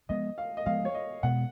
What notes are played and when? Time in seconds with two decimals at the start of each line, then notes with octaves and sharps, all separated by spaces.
0.09 F3 G#3 B3 D#5
0.38 F5
0.57 D#5
0.66 F3 G#3 B3 F5
0.85 C#5
0.95 D#5
1.23 B2 G#3 B3 F#5